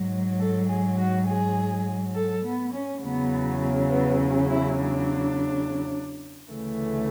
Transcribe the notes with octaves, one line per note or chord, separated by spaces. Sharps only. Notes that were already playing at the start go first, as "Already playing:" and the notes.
Already playing: G#2 F#3
A4
G#4
F#4
G#4
A4
B3
C#4
E2 C#3 F#3 B3
B3
C#4
E4
D4
D2 C#3 E3 A3